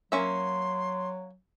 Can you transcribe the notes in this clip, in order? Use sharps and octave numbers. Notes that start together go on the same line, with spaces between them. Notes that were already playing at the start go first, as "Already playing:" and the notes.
F#3 A#3 C#4 E5 C6